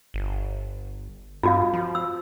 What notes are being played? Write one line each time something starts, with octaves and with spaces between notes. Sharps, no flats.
G1
G2 F4 F#4 F5
F3
E6